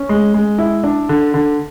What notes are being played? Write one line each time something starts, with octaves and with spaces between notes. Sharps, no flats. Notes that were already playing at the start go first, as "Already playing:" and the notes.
Already playing: C#4
G#3
G#3
E4
D4
D3
D3